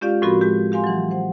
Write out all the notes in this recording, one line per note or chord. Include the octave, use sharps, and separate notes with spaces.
G#3 C#4 F4 G4 D5 F5
A2 F3 C4 F#4 A#4 B5
G#3 G4
G4 F5 G#5 C6
E3 F#3
C5 F#5